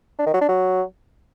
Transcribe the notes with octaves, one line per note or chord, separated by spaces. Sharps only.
D4
D#3
F#3
D4
F#3